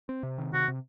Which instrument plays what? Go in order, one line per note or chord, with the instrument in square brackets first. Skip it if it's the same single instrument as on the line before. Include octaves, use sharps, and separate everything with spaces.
[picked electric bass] C4
C3
D#3
[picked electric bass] C3 [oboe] F#4
[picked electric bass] C3